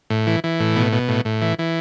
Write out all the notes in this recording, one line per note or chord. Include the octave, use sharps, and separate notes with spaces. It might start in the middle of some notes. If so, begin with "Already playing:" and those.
A2
E3
E3
A2
B2
B2
A2
A2
E3
E3